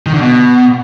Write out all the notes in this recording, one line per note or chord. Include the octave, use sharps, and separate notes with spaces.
D#3
D3
B2